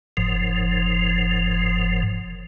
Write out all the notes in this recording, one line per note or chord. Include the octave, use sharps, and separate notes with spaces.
F#1 G#2 F3